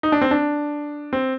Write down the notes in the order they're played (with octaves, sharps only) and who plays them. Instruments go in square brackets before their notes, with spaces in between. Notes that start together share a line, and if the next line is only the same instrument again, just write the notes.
[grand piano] D#4
D4
C4
D4
C4